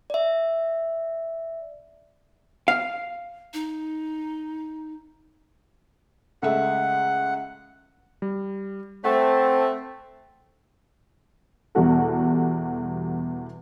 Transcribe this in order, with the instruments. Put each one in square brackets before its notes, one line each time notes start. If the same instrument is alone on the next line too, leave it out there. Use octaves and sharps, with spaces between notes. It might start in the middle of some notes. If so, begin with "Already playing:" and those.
[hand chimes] D5 E5
[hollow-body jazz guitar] F5
[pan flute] D#4
[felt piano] C#2 A3 E5 [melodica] F#5
[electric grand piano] G3
[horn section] A3 [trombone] C4 [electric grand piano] F#5
[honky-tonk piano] E2 B2 G3 F#4 A4